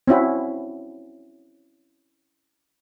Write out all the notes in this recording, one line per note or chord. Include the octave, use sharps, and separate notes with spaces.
C4 C#4 E4 F#4